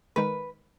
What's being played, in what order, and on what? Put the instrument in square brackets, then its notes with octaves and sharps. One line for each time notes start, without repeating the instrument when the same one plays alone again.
[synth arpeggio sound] D#3 G#3 D#4 A#4 [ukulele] B4